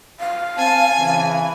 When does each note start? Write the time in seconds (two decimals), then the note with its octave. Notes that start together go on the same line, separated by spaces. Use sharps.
0.20 F5
0.58 C4 G#5 A5
0.99 C#3 E3